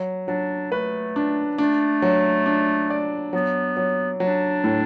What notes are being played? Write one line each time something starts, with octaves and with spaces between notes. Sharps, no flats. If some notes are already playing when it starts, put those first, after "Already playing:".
Already playing: F#3
F#3 D4
A3 B4
D4
A3 D4
F#3
D4
D5
F#3 B3
F#3
F#3 D4
A2